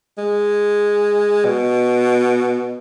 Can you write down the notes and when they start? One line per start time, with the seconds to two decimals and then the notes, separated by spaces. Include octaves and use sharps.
0.18 G#3
1.45 B2